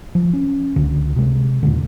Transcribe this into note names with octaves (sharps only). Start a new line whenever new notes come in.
F3
C#4
C#2 D3
C3 G#3
D#2 A#2 D3